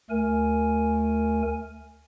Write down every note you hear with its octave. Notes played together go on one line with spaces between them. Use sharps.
D2 A3 A#4 G#5